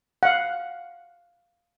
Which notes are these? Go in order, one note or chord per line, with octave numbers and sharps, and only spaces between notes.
F5 F#5